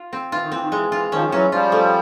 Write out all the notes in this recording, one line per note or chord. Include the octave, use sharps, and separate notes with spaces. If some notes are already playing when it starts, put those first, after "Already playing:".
Already playing: F4
C4
E3 F4
D#3
E3 C4
D#3
E3 G#3
E3 F4
D#3 F3 C#4
F3
E3 F#3 C#4
F3 G3 F4
A3